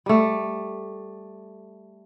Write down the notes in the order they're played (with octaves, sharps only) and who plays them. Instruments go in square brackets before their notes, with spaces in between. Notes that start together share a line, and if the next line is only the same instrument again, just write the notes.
[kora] G3 A3